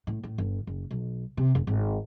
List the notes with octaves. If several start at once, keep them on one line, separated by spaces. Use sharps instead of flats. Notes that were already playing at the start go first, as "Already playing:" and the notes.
A2
A2
G1
F#1
B1
C3
F#1
G#1